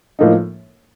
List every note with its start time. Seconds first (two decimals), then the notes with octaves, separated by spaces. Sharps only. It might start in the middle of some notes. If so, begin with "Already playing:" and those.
0.19 A2 F3 A#3 D#4